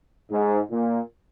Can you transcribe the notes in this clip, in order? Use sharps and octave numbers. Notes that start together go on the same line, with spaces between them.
G#2
A#2